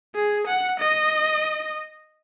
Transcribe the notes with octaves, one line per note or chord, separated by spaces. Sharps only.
G#4
F#5
D#5